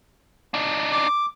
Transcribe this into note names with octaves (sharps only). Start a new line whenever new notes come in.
D4 D#4
D6